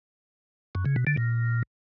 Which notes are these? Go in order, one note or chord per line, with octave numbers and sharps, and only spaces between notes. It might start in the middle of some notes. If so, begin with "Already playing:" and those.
F#2
C#3
B2
D3
A#2